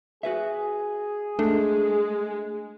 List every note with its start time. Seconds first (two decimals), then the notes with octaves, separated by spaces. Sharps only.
0.23 F#4 G#4 B4 E5
1.39 G#3 A3 D4